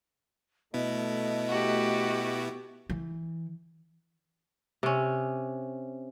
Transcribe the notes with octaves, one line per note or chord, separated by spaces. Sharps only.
B2 A3 B3 E4 D#5
F#4 G4
E3
C3 C#4